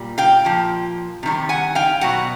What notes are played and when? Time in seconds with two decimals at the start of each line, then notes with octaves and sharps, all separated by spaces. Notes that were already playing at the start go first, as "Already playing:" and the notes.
Already playing: A#2 G3
0.18 F5 G5
0.45 A#2 F3
1.23 C3 D#3 G3
1.49 F#5 G#5
1.75 F5 G5
2.01 B2 F#3 F#5